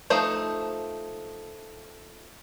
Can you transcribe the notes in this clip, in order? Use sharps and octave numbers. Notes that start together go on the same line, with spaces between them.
F3 A3 D#4 C5